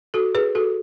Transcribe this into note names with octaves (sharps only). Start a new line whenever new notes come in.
F#4 A4
G#4 B4
F#4 A4